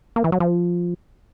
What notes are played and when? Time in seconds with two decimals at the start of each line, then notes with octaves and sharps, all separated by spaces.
0.16 A#3
0.24 E3
0.32 F#3
0.40 F3